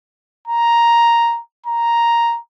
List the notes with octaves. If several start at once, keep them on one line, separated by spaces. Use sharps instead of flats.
A#5
A#5